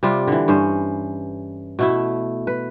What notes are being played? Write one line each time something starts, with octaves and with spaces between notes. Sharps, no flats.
C3 G3 F4
D3 E3
G2 C#4 C5
B2 A3 E4
B4